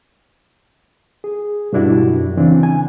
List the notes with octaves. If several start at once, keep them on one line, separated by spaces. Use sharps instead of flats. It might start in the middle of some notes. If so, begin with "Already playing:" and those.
G#4
G2 B2 D4 E4 F#4 G4
F#2
C#3 E3 C4 D4
G#5